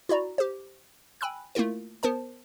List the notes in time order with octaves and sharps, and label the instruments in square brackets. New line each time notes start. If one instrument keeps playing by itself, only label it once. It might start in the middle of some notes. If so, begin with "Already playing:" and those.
[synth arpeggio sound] E4 F#4 D5 A#5
G4 C5
G5 G#5 B5 E6 F#6
A3 A#3 E4 F4 A#4
B3 A#4 C5 A5